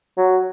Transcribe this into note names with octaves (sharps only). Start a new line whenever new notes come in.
F#3